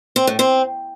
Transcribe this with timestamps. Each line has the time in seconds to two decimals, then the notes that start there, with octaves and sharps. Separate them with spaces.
0.16 C4
0.27 A2
0.39 C4